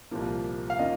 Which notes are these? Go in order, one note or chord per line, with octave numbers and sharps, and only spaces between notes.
C2 A#2 F3 A#3
F5
D#3 A#3 C#4 F4 D#5